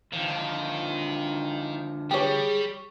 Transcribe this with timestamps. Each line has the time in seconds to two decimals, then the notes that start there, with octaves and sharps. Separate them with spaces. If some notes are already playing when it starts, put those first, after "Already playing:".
0.13 D3 D#3 F3
2.11 G3 G4 G#4 C#5